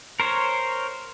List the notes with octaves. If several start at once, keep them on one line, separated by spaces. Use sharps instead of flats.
A#4 C5 C#5